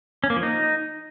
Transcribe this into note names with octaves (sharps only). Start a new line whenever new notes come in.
C#4
A#3
F3
D#4